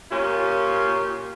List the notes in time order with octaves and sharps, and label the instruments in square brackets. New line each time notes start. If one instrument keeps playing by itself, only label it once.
[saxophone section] A#2 C#4 F4 G4